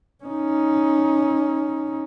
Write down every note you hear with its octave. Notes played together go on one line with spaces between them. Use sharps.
C#4 D#4